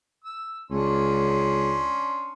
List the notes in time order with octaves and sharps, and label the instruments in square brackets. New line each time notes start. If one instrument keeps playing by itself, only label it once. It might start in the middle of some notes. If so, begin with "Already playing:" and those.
[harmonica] E6
[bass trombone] C#2 [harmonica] C#4 D4 C6